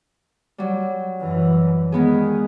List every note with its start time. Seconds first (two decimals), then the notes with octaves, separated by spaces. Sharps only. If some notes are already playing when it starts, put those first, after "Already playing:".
0.58 F#3 G3
1.20 F#2 E3
1.92 D#3 G#3 B3 G#4